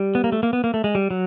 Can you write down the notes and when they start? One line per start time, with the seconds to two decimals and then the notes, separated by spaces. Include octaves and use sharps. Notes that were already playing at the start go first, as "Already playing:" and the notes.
Already playing: G3
0.15 B3
0.24 A#3
0.32 A3
0.43 A#3
0.53 B3
0.64 A#3
0.74 A3
0.84 G#3
0.95 G3
1.11 F#3